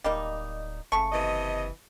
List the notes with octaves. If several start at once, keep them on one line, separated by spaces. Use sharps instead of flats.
D1 G3 A#3 D#4 D#5
F#1 C#3 A3 A5 C#6 C#7
C3 E3 D#5